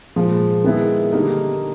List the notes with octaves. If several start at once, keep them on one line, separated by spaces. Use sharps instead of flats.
A#2 F3 G#3
D#3 G#3 B3 E4
D3 G3 A#3 D#4